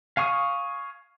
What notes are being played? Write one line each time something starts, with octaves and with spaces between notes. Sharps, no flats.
F5 G#5 C#6 D#6